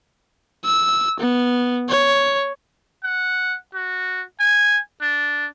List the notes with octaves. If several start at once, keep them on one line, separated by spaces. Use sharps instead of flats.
E6
B3
C#5
F#5
F#4
G#5
D4